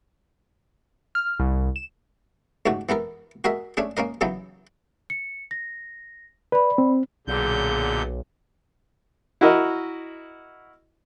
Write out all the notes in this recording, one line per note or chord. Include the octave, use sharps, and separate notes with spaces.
F6
C2
E7
C#2 G#2 A3 F#4
E3 B3 A4 A#4
F#4 G#4 A#4 D#5 E5
A3 C#4 D4 G#4
A#3 C#4 A#4 D#5
C#3 E3 F#3 B3 D#4
C#7
A#6
B4 D5 B5
C4
B1 A#2 D3 G#4 G6
E4 F#4 A#4 D#5